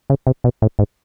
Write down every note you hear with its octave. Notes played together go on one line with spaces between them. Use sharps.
C#3
C3
B2
A2
G#2